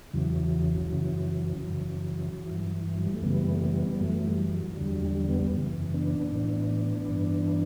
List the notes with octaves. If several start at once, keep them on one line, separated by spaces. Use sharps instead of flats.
E2 C#3 E3 F#3
F#2 C#3 E3
F#2 C#3 E3
G2 E3
F#3
G3
A3
F#2 C#3 E3 G3 B3
A3
G3 B3
F#2 E3 F#3 A3
G3
F#3
E2 D3 G3
F#3
G3
G3 B3
F#2 C#3 E3
B3 D4
A2 E3 B3 D4
G2 E3